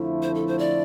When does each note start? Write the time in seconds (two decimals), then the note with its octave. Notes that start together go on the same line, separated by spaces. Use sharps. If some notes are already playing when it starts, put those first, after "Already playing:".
Already playing: F2 D3 F3 A3 E4
0.22 C5
0.35 A4
0.47 C5
0.59 D5